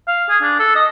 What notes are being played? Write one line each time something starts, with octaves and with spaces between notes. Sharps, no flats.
F5
G#4
D4
A4
D#5